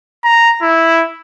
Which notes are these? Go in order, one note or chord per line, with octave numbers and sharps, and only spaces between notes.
A#5
E4